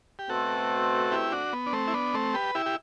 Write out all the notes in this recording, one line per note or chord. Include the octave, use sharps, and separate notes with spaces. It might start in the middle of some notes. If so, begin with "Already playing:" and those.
G4
B2 A3 C4 F#4 A4
E4 G4
D4 F#4
B3
D4
A3 C4
E4
B3 D4
A3 C4
G4 B4
E4 G4
G4